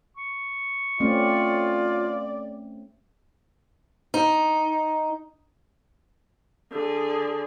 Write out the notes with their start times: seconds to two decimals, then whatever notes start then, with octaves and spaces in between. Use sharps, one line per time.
0.17 C#6
1.00 A3 C4 C#4 F4 D5
4.14 D#4
6.72 D3 G#4